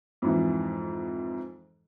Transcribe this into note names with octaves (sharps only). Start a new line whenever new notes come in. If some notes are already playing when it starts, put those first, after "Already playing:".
F2 G#2 E3